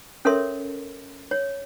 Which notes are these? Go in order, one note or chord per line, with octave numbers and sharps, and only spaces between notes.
C#4 A4 A#4 C#5 E5 C6
C#5